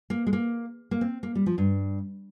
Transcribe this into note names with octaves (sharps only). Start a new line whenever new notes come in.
A#3
G#3
A#3
A#3
C4
A#3
G3
F3
G2